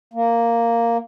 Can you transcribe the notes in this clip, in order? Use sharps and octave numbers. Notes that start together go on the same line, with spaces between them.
A#3